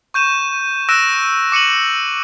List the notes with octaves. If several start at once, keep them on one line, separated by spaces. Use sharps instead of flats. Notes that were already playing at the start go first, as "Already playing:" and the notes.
C#6 G6 D#7 E7
E6 F#6 A#6 D7 E7
D6 C#7 D#7 F#7